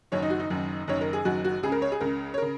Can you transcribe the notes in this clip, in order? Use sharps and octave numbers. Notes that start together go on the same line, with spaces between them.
F#1 F#2 D#3 C#5
D#4
F#4
D#4
F#1 F#2 D#3
F#1 F#2 D#3 C#5
A#4
G#4
F#1 F#2 D#3 F#4
F#4
C#2 C#3 G#4
A#4
C#5
G#4
C#2 C#3 A#4
C#5
C#3 A#4